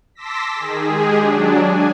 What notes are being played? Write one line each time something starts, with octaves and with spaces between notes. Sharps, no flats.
A5 C6 D6 E6 A#6 B6
D#3 G#4
G#3 G4 G#4
F#3 D4
G#5